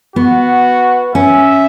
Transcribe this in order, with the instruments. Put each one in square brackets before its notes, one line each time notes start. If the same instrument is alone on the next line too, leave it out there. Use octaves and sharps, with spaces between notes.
[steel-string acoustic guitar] B3 [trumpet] F#4
[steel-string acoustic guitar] C#4 [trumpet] E5